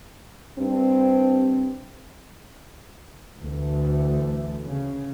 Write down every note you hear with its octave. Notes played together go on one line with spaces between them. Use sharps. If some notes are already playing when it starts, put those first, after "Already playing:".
G2 C4
D2 E3 A3
C#3